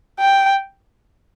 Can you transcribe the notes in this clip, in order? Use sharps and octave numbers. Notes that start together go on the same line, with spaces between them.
G5